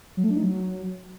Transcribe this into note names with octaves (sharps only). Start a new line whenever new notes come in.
F#3
A3
D4
D#4
F#3